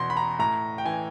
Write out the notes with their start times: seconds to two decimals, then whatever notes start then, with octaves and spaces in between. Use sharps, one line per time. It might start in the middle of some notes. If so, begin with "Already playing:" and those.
Already playing: E2 B2 C6
0.10 B5
0.17 A#5
0.39 A2 A#5
0.78 G5
0.86 E3 G#5